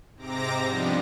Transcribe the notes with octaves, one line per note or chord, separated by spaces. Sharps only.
G#2 C3 C4 A#5 D6 A#6
F3 G3 B3 D4 D#4 G4